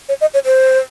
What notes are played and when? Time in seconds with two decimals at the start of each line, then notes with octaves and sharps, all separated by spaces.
0.09 C#5
0.21 D#5
0.34 C#5
0.45 C5